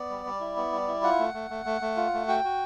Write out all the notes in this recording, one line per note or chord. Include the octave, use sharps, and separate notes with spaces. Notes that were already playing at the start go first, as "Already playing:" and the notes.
Already playing: B3 D5
G3
G3
E4
B3
G3
E4
F4 F#5
A3
A3
A3
A3
A3
F4
A3
F#4 G5
F#4